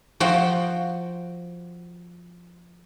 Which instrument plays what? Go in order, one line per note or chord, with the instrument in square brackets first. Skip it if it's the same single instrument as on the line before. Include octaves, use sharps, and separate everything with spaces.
[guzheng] F3 F#4 G5